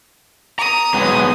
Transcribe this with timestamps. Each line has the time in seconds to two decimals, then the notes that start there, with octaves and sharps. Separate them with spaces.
0.59 A#5 D#6
0.94 F#3 G#3 B3